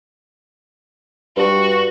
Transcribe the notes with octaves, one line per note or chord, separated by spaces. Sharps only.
G2 F#4